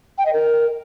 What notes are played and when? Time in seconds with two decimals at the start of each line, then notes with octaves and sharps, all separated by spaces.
0.18 G5
0.25 D#5
0.33 A#4